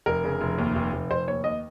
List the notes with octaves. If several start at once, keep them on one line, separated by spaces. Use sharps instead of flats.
F1 A#4
C#3
F1
D#2
F1
F1
F1 C5
D#2 C#5
D#2 D#5